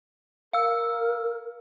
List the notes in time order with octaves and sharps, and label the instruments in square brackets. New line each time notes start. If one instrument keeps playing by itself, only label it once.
[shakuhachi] A#4 [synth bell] F5 E6